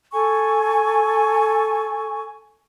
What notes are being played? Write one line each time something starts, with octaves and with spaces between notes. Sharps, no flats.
A4 G#5 C#6